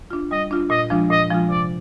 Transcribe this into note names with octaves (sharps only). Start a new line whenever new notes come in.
D4 F4
G3 D#5
D4 F4
A#2 D#5
F3 G#3 D4 F4
A#2 D#5
F3 G#3 D4 F4
C3 D5